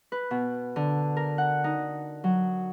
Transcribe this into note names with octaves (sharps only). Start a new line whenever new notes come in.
B4
B2
D3
A#4
F#5
D#4
F#3